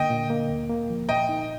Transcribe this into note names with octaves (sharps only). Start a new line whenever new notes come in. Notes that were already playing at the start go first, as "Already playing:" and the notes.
Already playing: D3 A#3 D#5 G5
A#2
A#3
D2
A#3
F3
A#2 D#5 G5
D#4